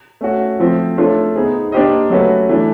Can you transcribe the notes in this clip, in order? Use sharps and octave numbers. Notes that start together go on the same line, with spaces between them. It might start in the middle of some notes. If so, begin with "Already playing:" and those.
A3 C#4 F#4
F3 A3 C4
A3 D4 F4 A4 C#5
B3 D#4 G#4 C5
A#3 D4 G4 C5 D#5
F#3 A3 C#4 F#4 B4
E3 A3 D4